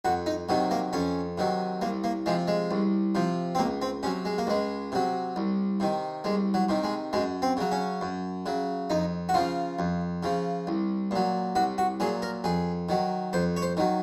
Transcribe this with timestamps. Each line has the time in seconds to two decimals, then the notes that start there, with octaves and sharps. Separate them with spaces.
0.05 F2 F#4
0.26 D#4
0.49 C3 D#3 F#3
0.71 A#3
0.93 F2 C#4
1.38 C3 D#3 F#3
1.81 C2 A#3
2.04 A#3
2.26 C3 F3 G#3
2.48 G#3
2.71 C2
3.15 C3 F3
3.55 C4
3.59 C#2 A#3
3.82 C4
4.03 C3 C#4
4.06 F#3
4.25 G#3
4.38 A#3
4.47 C#2 G#3
4.92 C3 F#3
5.36 C2
5.80 C3 D#3
6.24 C2 G#3
6.54 F#3
6.69 C3 D#3
6.84 G#3
7.13 F#2 G#3
7.42 C4
7.57 C#3 F#3
7.72 C#4
8.01 F#2
8.46 C#3 F#3
8.90 F2 D#4
9.29 F#4
9.34 C#3 F3 F4
9.79 F2
10.23 C#3 F3
10.67 C2
11.11 A#2 F#3
11.56 C2 F#4
11.78 F#4
12.00 A#2 F#3 G#4
12.22 A#4
12.44 F2 G#4
12.89 D#3 F#3
13.33 F2 C5
13.57 C#5
13.62 C5
13.77 D#3 F#3